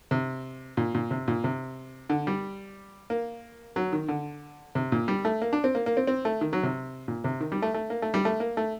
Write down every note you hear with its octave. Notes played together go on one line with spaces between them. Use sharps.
C3
A#2
A#2
C3
A#2
C3
D3
G3
A#3
F#3
D#3
D3
C3
A#2
G3
A3
A#3
D4
C4
A#3
A#3
C4
C4
A3
D#3
F#3
C3
A#2
C3
D#3
G3
A3
A3
A#3
A3
G3
A3
A#3
A3